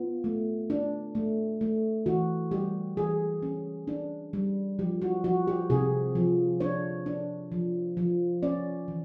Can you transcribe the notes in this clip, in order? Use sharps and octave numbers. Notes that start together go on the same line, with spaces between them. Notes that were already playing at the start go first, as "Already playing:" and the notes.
Already playing: B3 F4
A3
D4
A3
A3
E3 F#4
G3 G4
E3 G#4
C#4
D4
G3
F3 G4
F#4
F3 F#4
G4
C3 G#4
F3
D4 C#5
D4
F3
F3
C#4 D5
E3